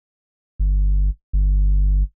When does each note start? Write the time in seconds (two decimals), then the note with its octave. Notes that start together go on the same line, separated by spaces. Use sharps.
0.60 G1
1.33 G1